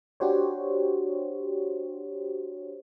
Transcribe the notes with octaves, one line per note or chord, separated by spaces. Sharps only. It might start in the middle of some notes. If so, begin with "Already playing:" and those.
D4 F#4 G4 C5 C#5